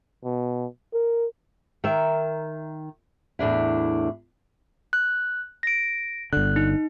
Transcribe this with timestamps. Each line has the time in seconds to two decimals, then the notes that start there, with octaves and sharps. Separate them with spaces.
0.24 B2
0.93 A#4
1.84 D#3 A#4 E5
3.39 E2 A2 D4 E4
4.93 F#6
5.63 A#6 D7
6.33 G1 D3 F#6
6.56 D#4